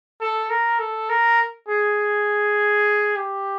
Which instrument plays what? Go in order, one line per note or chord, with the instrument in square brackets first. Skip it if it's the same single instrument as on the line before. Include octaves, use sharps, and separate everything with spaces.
[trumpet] A4
A#4
A4
A#4
G#4
G4